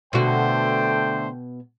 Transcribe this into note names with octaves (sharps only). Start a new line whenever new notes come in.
B2 D3 A3 F#4 C5 G5